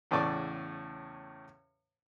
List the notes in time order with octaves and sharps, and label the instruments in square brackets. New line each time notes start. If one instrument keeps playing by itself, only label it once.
[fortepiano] E2 A2 C#3 D5 A5 C#6